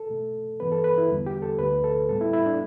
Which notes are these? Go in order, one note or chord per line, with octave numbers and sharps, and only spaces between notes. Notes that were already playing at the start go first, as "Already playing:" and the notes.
Already playing: A4
B2 A3
G2 E3 B3 B4
A4
B4
E4
E2 D3 G3 B3
G4
A4
D2 D3 A3 B4
A4
A2 G3 B3 A4
E4
E4
D4